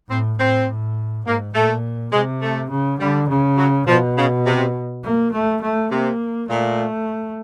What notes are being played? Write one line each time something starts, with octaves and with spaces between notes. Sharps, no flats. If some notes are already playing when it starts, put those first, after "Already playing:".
A2 C4
A2 C4
A2
G#2 A#3
A#2 A3
C3 G#3
A3
C#3
D3 G3
C#3
F#3
B2 F3
C#3
C3
A#3
A3
A3
C3 A#3
A#2 A3